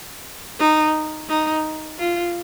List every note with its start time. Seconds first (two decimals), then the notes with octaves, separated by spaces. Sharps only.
0.60 D#4
1.29 D#4
1.99 F4